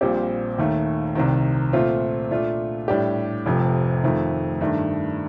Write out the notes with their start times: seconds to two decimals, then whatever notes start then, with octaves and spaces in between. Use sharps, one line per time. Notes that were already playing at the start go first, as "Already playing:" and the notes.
0.01 A#1 A#2 G3 C4 G4
0.58 D#2 D#3 A3
1.15 C2 C3 D#3
1.73 A#2 A3 C4 F4
2.31 A#2 A3 D4 F4
2.88 A2 G3 D4 G4
3.46 F1 F2 C3
4.04 F2 D#3 A3
4.61 G2 D#3 A3